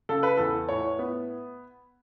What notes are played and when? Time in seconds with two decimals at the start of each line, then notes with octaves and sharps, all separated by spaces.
0.09 C#3 A4
0.23 B4
0.37 E2 A4
0.69 A2 C#5
0.99 B3